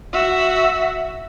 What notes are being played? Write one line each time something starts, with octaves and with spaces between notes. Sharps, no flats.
F#4 E5